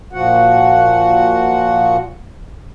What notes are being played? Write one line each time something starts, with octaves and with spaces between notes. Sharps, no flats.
A#2 F3 F#4 F#5